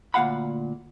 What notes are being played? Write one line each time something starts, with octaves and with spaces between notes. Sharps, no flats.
D2 A#2 G3 F5 F#5 B5